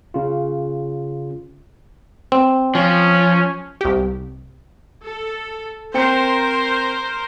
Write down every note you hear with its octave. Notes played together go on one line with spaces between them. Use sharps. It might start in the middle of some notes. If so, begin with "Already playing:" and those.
C#3 F4
C4
F3 C#4
C2 G4
A4
C4 A#4 C5 G5 C#7